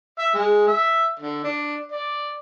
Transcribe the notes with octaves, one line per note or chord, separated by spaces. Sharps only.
E5
G#3
E5
D3
D4
D5